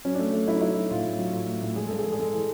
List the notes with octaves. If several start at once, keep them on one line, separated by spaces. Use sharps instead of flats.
F#3 C#4
D4
A3
A3
F#3 E4
D#4
F#3 E4
F#3
A2 F4
A2
F#3
A2 F4
A2
A2
G#3 G#4
G2 A4
G#4
G#3
G#4
G#3 A4
E3